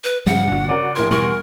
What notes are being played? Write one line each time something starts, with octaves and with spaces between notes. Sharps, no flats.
B4
G#1 G2 C#3 F3 G3 F#5
G1 A#2 D4 F#4
C#3 C#4 F#4 A#4 D5
A#1 A2 A#4 C6 G#6
E2 B2 E3 G3 A#4 C#6